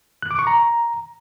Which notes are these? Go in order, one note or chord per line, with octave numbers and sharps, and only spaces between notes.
F#6
D6
C#6
A#5